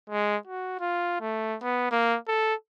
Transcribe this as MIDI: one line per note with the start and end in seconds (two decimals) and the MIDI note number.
0.10 0.37 56
0.47 0.78 66
0.80 1.17 65
1.21 1.57 57
1.63 1.89 59
1.92 2.17 58
2.28 2.54 69